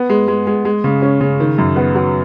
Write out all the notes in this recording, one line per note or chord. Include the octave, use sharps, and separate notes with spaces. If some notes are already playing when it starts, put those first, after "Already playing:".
Already playing: B3
G#3
G#3
G#3
G#3
C#3
C#4
C#3
D#3
F#2
B3
F#3